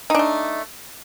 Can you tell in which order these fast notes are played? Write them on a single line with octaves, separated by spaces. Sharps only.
D#4 D4 A3